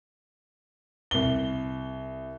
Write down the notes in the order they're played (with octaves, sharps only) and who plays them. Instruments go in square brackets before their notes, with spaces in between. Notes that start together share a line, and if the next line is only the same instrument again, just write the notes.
[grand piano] C2 G7